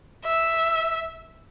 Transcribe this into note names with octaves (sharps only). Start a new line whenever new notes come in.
E5